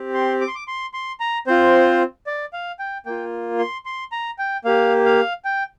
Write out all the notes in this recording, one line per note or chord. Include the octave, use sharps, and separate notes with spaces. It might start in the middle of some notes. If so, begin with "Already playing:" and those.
Already playing: C4 G4
C6
D6
C6
D6
C6
C6
A#5
C4 F4 C5
D5
F5
G5
A#3 F4 G5
C6
C6
A#5
G5
A#3 G4 F5
F5
G5